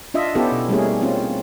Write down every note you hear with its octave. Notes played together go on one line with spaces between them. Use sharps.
D4 F4 D#5 E5
B3 C#4 E4 G4 A4
B2
G3 A3 A#3 C#4 D#4 G#4
C4 C#4 F4